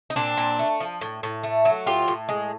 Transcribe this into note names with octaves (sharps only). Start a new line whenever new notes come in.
D#4
A#2 C4 D4
A#2
A3
F3
A2
A2
A3
F#3
A2 F4 G4
A2
G#3